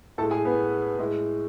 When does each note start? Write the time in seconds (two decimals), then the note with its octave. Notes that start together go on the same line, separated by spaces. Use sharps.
0.18 A2 A4 A5
0.22 G#3
0.31 G#4 G#5
0.45 B3 B4
0.99 A2 G#3